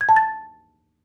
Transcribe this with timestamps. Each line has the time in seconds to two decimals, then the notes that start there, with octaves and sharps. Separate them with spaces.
0.01 G#6
0.09 A5
0.16 A6